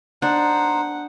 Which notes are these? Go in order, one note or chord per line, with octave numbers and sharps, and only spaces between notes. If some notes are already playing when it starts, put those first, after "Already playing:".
D4 D#4 C5 F#5